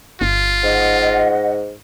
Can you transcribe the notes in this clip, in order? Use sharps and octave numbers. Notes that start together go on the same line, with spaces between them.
G1 F4
G#2 D#5 F#5